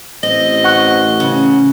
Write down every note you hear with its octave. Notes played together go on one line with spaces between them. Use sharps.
A1 C4 D#5
F#5 C#6 F#6
C#3